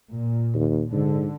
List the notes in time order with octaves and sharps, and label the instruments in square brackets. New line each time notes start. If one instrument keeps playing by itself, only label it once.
[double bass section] A#2
[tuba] D#2
[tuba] G#2 [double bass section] D3